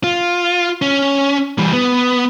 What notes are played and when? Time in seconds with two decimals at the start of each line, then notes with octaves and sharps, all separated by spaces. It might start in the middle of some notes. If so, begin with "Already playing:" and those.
0.04 F4
0.82 C#4
1.58 E3 G3
1.73 B3